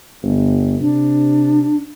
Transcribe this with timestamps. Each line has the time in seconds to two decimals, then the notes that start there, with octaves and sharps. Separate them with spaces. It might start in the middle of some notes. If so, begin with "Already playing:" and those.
0.23 G1
0.80 C3 D4